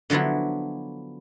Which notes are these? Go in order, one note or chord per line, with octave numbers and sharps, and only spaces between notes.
D3 F3 F#3 B3 E4